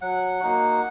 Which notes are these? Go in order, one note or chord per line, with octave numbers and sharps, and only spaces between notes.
F#3 F#5
A#3 D#4 F#4